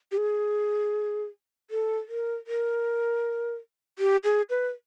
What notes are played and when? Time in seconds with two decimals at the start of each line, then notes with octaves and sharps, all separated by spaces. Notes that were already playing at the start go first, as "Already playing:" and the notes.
0.12 G4
0.17 G#4
1.70 A4
2.08 A#4
2.47 A#4
3.99 G4
4.24 G#4
4.50 B4